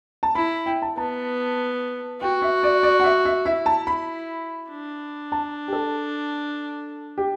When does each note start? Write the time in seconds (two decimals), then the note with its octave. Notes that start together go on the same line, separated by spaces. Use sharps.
0.23 A5
0.35 E4 B5
0.66 G5
0.82 A5
0.97 B3 A5
2.21 F#4 G5
2.42 E5
2.63 D5
2.83 D5
3.00 F#5
3.04 E5
3.25 E5
3.46 E4 E5
3.66 A5
3.87 B5
4.69 D4
5.32 A5
5.68 G4
5.73 A4
7.18 G4